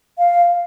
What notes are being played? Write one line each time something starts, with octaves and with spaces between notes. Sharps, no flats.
F5